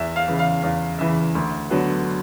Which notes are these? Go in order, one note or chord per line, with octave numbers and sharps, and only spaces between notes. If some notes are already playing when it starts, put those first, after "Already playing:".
Already playing: E2 E5
F5
C#3 E3
F5
E2 F5
C#3 E3 E5
D2
D3 F#3 B3